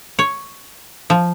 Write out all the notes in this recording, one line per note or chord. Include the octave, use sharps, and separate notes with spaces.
C#5
F3